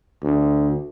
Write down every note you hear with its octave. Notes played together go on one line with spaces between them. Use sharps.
D2